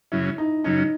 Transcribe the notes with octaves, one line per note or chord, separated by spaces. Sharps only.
F#2 C#3 F#3 C#4 E4
D#4
F#2 C#3 F#3 C#4 D#4